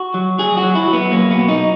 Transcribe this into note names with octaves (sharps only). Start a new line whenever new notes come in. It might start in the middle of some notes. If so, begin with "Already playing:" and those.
Already playing: F#4
F#3
F#3 G#4
F#4
F#3
E4
F#3
B3
F#3 A#3
B3
B2
D#4